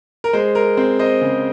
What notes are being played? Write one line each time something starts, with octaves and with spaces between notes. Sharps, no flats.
A#4
G#3 C5
A#4
C4 C5
C5 D#5
C#3